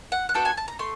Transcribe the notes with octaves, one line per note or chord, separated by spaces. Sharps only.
F#5
F#5
B3 D4 F#4 A4 G5
G#5
A5
A#5
A3 C6